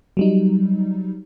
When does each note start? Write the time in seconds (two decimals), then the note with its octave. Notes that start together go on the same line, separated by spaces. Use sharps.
0.17 F#3 G3 D#4